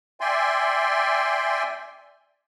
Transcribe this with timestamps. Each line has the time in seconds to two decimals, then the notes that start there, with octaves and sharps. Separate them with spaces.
0.21 D5 E5 G5 G#5 C6